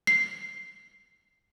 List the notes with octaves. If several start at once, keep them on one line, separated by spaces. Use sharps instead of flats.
C7